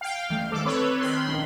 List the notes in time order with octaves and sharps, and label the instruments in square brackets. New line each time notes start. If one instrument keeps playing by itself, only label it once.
[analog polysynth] F5 G5
[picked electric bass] E3 A3
[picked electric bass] G2 D#3 G#3 [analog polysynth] A4 D6
[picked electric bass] C4 [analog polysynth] A4 B4 C#5
[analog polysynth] D#3 B5 C6
[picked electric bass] A#1 C#4 D4